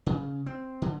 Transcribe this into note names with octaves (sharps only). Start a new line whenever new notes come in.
C#3
C4
D3